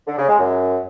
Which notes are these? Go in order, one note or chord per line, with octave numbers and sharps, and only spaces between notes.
D3
C#3
G#3
F#2